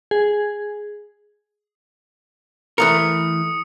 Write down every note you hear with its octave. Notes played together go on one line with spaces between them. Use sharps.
G#4
E3 A3 A#4 D#6 C#7